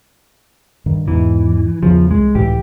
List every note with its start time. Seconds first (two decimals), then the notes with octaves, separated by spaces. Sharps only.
0.86 G2 D#3
1.08 E2 G#2 E3
1.83 E2 C#3 F3
2.11 C2 G#3
2.35 C#2 A2 E3 G4